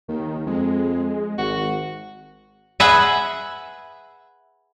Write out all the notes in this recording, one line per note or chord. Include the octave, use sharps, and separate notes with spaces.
D#2 D#3
F2 G#3
G#1 F#4
G#4 B4 E5 F#5